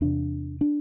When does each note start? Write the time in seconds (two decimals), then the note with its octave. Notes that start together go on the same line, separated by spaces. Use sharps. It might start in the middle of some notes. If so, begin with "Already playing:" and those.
0.01 E2 C3 D4
0.61 D4